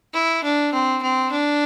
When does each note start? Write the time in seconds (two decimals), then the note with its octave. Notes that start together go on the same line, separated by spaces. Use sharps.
0.14 E4
0.44 D4
0.73 C4
1.03 C4
1.32 D4